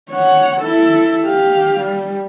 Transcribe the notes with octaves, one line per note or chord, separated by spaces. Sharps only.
C#5 F#5
E4 A4
G4 F5
G3